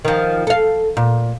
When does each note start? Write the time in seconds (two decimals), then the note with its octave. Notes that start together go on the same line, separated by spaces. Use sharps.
0.05 D#3 F3
0.47 A4 F5
0.97 A#2